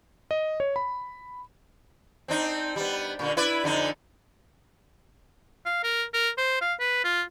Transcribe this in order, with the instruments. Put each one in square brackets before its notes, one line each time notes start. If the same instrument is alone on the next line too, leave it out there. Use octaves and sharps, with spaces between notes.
[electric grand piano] D#5
C#5
B5
[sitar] C4 D4 D#4
G3 B3
A#2 D3
E4 B4 D5
F2 D3 D#4
[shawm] F5
A#4
A#4
C5
F5
B4
F4